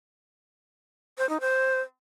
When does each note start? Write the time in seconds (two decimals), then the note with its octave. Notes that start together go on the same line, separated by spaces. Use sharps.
1.18 C5
1.29 D#4
1.40 C5